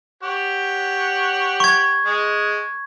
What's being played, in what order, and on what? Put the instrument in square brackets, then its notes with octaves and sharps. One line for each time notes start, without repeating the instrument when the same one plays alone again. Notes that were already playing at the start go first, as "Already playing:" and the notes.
[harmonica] G4 C#5 F#5
[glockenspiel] C#6 G#6
[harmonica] G#3